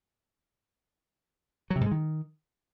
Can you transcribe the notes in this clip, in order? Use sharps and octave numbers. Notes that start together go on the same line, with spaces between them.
F#3
C3
G#2
G#3
D#3